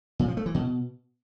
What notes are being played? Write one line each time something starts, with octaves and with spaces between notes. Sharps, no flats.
A#2
F3
A3
E3
B2